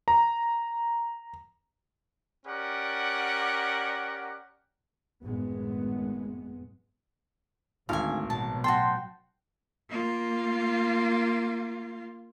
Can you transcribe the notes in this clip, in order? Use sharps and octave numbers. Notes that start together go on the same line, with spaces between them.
A#5
C#4 G4 A#4 D5 F#5
G#1 F#2 A2 G#3 B3
G#1 D2 G#2 F5 G#5
A1 B2 F#3 A5
F#4 G5 A5 C6
A#3 F4